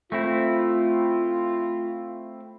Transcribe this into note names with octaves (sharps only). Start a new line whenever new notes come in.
A3 C4 E4 F4